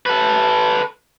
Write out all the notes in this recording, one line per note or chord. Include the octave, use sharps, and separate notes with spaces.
A4 B4